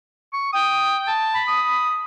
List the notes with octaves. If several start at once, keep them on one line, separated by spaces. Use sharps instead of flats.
C#6
G5 D#6
A5
B5
D#6